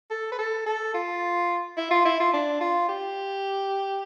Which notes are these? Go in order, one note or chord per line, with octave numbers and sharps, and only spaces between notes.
A4
B4
A4
A4
F4
E4
F4
E4
F4
D4
F4
G4